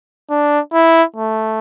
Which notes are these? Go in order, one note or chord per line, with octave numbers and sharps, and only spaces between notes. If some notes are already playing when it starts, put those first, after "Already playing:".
D4
E4
A3